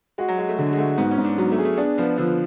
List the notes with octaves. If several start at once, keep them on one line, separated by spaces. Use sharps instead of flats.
G#3 F#4
F#3
G#3 F#4
A3
D3 G#3
G#3
A3 F#4
G#2 B3
C#4
G#2
D4
F#3 B3
A3
G#4
A3
B3 D4
F3 B3
D3 F3